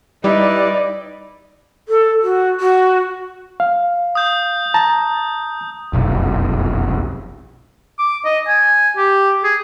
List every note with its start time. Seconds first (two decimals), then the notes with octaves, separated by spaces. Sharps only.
0.24 G3 D#4 E4 B4 D5
1.89 A4
2.23 F#4
2.60 F#4
3.60 F5
4.15 D#6 G6
4.74 A5 A#5
5.93 F1 B1 F#2
7.98 D6
8.25 D#5
8.48 G#5
8.97 G4
9.44 G#4